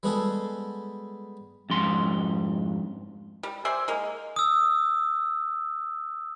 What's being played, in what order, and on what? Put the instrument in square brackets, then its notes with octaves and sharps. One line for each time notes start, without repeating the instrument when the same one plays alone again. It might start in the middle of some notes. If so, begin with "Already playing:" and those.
[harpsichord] G3 G#3 B3 F#4 G#4 A4
[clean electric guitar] F2 G#2 C6
[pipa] G3
C5 D5 E5 G#5
G#3 A#3
[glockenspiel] D#6 E6